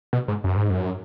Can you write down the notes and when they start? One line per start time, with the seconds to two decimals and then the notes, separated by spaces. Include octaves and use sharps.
0.13 B2
0.28 G#2
0.44 F#2
0.56 G#2
0.70 F#2